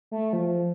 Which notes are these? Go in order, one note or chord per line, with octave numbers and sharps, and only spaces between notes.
A3
F3